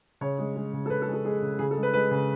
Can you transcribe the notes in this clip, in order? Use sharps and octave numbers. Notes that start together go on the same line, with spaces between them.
C#3 C#5
G#3
G#3
C#3
A4
C#3 B4
A4
G#3
A4
G#3 G#4
C#3
C#3 G#4
A4
G#3
B4
G#3 B4
C#3